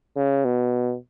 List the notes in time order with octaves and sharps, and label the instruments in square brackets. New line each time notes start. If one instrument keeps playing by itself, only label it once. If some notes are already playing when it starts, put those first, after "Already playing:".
[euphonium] C#3
B2